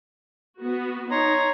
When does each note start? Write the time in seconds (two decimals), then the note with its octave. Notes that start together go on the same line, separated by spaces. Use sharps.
0.63 B3 F#4
1.11 D#4 C#5 A#5 C6